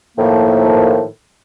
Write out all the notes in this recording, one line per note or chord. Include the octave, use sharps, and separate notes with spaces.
A2 D#3 F3 A#3